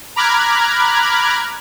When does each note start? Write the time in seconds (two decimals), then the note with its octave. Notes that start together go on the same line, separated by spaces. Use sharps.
0.16 A#5 B5 D6 F6 F#6 G#6